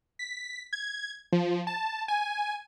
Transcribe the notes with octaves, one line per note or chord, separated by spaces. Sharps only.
B6
G#6
F3
A5
G#5